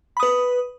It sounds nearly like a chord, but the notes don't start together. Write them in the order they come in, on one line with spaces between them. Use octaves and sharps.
B5 D#6 B4